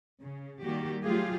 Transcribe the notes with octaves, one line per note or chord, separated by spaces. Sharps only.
C#3
D#3 G3 A#3 F#4 G4
F#3 A3 F4 G4 G#4 F5